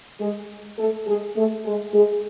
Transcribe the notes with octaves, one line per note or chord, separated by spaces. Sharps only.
G#3 G#4
A3 A4
G#3 G#4
A3 A4
G#3 G#4
G#3 G#4